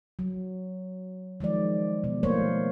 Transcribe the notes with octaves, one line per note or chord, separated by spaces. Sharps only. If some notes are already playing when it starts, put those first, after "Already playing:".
F#3
D#3 F3 G#3 D5
B2
F3 A3 A#3 C5 C#5